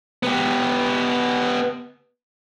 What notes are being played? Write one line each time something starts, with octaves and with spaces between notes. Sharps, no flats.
B3 G4